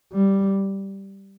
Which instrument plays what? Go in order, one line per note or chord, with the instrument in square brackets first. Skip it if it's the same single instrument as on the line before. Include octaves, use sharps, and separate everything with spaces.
[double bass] G3